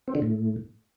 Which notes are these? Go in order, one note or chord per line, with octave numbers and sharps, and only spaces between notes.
C4
D3
A2